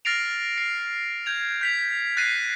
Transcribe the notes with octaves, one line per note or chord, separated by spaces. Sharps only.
F6 A6 A#6 C7 D7 F7
C7
G6 G#6 F7
G6 B6 F7
F#6 A6 A#6 C7 D#7